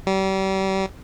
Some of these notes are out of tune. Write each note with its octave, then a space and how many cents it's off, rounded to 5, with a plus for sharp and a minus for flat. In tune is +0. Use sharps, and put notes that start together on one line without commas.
G3 -35